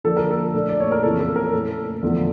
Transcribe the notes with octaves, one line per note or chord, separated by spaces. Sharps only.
D3 F3 A#3 D4 A4
A#4
A4
A#2 A3 D4
D5
C#5
A#4
F2 C#3 E3 A#3 A4
A4
A#4
A#2 A3 C#4 A4
E2 D3 F3 A3